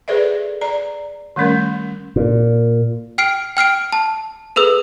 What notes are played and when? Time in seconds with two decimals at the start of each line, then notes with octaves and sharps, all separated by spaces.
0.08 G#4 A4 B4 C5 D5 E5
0.61 D5 A#5
1.36 D#3 G3 A3 C#4 A#4
2.16 A#2
3.18 G5 F6 C7 D7
3.57 G5 F6 C7 D7
3.92 A5
4.56 G#4 A4 B4 E6